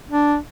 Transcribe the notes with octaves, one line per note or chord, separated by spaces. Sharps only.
D4